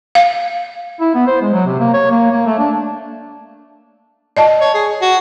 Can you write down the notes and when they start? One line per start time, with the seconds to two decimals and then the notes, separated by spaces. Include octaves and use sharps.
0.15 F5
1.00 E4
1.15 B3
1.27 C5
1.41 G#3
1.53 F#3
1.66 C3
1.79 A#3
1.93 C#5
2.10 A#3
2.31 A#3
2.46 A3
2.58 D4
4.37 D5 D#5 A5
4.61 C#5
4.74 G#4
5.02 F#4